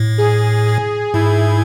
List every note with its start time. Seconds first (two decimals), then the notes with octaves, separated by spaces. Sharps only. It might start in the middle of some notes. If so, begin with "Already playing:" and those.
Already playing: A2
0.18 G#4
0.66 G#4
1.14 G#2 E4